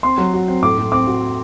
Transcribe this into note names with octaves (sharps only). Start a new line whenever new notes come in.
C4 C6
F#3
F#4
C4
A2 D6
A2
C4 D6
F#4